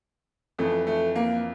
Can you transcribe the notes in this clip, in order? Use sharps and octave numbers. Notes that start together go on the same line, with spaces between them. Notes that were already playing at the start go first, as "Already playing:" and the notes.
F2 E3 A3
A3
A#3